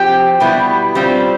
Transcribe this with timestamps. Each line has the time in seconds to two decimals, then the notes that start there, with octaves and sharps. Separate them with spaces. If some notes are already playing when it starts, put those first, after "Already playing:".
Already playing: F3 C4 G4
0.40 B2 G3 B3 E4
0.95 G3 C4 F4